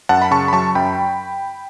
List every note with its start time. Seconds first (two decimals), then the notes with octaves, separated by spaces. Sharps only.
0.09 F#2 F#5 A5
0.22 B5
0.31 C#3 A5 C#6
0.48 B5
0.53 F#3 A5 C#6
0.75 F#2 G5 B5